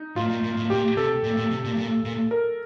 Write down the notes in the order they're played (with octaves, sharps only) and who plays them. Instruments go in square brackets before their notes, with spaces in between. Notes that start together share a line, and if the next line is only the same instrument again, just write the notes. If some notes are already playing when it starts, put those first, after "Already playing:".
Already playing: [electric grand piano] D#4
[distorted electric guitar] A2 [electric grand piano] F4
[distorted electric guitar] A#2
A#2
A2
[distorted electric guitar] A#2 [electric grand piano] G4
[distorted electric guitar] C3 [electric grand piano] A4
[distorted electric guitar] A#2
A#2
C3
A#2
A#2
A#2
[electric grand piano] A#4